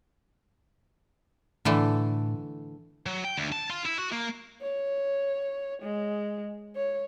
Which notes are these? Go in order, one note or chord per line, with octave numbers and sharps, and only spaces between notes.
A2 D3 E3 A3
F#3
G5
D2
A5
F4
E4
F#4
A#3
C#5
G#3
C#5